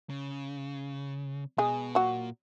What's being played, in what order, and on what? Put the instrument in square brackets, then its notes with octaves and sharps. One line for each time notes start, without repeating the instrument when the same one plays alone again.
[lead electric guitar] C#3
[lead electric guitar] B2 [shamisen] G#3 G#4
[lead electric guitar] A#2 [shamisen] F#3 F#4